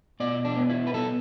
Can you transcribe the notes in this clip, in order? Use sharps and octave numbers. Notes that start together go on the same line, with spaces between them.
B2 D5
D4
B3
E4
B4
B3 A4